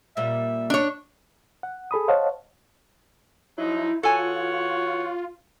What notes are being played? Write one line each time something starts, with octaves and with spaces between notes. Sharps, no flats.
A#2 G3 A#3 E5
D4 C#5
F#5
G#4 A4 B5 D#6
C5 C#5 D#5 F5 F#5 A5
F3 F#3 D#4 E4
E3 F4 F#4 A4 C#5 G#5